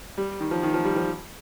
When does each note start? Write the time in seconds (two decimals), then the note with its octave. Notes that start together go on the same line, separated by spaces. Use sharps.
0.18 G3
0.40 D#3
0.51 F3
0.63 D#3
0.74 F3
0.85 G3
0.96 F3